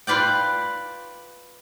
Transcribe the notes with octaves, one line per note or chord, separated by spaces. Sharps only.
F4 B4 D5 G5